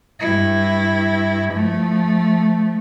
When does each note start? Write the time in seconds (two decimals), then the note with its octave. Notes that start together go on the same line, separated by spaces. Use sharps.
0.20 G2 E4
1.53 F3 A3